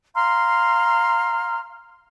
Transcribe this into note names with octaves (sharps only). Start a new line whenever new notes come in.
F5 A#5 C6 F6